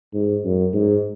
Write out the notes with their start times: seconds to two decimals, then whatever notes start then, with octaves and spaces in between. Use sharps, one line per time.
0.14 G#2
0.44 F#2
0.73 G#2